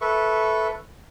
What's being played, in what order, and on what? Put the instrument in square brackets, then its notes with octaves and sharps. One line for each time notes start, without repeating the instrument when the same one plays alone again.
[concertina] A4 B4 E5 C#6